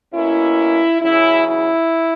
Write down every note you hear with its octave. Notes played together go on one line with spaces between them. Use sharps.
B2 A#3 C#4 E4
E2 C#3 F#3 C#4 E4
E4